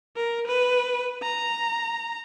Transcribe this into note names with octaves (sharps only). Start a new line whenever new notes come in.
A#4
B4
A#5